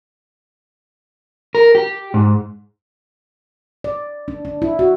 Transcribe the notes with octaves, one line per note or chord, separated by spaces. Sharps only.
A#4
G4
G#2
D5
D4
D4
E4
F#4